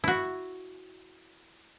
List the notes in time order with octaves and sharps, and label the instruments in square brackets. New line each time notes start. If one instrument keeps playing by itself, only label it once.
[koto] E4 F#4